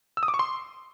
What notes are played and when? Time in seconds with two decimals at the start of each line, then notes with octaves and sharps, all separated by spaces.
0.17 E6
0.23 D#6
0.28 D6
0.34 C#6
0.39 C6